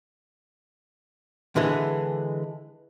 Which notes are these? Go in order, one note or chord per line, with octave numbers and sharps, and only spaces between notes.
D3 E3 G#3